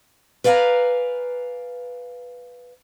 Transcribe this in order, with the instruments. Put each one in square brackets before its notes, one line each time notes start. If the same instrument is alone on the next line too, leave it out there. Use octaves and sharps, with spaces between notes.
[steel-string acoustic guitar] B4 D5 F5 G5 G#5 A#5